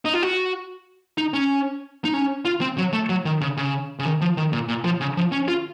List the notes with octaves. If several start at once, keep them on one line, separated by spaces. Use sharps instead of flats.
D#4
F4
F#4
D#4
C#4
D#4
C#4
F4
C4
F#3
A3
F#3
D#3
C#3
C#3
C#3
D#3
F3
D#3
A#2
A#2
F3
C#3
F3
C#4
F4